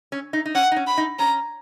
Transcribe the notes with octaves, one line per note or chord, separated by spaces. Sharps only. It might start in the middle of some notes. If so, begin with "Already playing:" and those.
C#4
D#4
D#4
C#4 F#5
D#4
C#4
B5
D#4
C#4 A#5